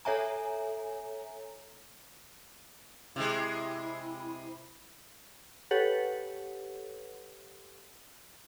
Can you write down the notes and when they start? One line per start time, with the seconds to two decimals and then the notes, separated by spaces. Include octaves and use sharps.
0.05 A4 C#5 E5 G#5 A#5
3.16 C3 G#3 E4
5.71 G4 A4 B4 C#5 F#5